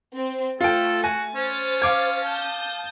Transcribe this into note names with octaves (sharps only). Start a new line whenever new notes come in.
C4
A3 F4 A4 G5
F#4 G#5
C#4 C5 A6
F5 D6 G#6
A5 D#6 G6